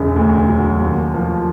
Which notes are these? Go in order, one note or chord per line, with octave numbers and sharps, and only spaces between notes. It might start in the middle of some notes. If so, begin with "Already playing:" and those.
Already playing: E1 C#3
D2
F#3
D#2
F3